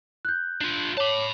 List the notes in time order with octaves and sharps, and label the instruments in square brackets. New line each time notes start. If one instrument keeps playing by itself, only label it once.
[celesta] F#6 G6
[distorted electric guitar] D4 F4
[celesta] C#5 D6 [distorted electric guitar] A5 B5